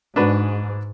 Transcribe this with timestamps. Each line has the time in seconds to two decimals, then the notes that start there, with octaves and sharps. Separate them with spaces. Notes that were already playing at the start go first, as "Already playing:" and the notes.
0.16 G#2 D4 F#4 B4